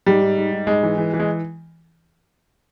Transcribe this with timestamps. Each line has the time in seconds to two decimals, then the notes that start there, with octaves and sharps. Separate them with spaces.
0.06 G#2 G3
0.22 G#2
0.37 G#2
0.52 G#2
0.67 G#2 G#3
0.83 E3
0.98 E3
1.14 E3
1.20 G#3